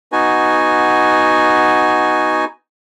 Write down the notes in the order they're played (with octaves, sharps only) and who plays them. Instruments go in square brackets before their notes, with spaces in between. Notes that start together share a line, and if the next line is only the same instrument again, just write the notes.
[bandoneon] B3 D#4 F#4 G#5